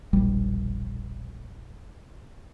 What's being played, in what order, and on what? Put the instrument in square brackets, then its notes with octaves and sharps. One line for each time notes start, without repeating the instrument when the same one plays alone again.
[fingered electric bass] E1 A#1 G3